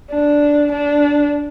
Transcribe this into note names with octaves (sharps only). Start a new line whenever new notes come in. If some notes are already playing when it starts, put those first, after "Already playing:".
D4
D4